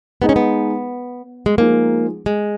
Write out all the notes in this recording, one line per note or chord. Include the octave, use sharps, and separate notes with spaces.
G#3 B3 D#4 G#4 D#5
C#4
B3
G#3
F3 G#3 A#3 D#4 G#4
G#3